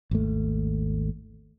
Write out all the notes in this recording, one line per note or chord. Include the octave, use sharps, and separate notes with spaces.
G#1 D#2 A3